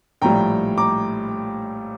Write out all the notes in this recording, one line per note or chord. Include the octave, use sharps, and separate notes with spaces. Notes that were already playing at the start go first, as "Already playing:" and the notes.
A#1 A2 G3 G5 A#5
A#5 D6